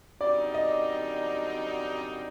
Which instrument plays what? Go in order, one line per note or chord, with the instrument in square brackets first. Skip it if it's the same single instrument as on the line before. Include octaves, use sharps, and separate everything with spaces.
[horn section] F#2 D3 G3 C4 D#4 [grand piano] D5
[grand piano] D#5